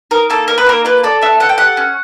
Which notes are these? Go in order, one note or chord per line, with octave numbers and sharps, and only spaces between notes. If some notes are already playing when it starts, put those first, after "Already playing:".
D#4 A#4
A#3 A4
D#4 A#4
B4
A#3 A#4
F4 B4
A4 D5
D4 E5
A4 F#5
G5
G4 F#5
C#4